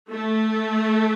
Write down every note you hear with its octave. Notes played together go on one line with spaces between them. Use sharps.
A3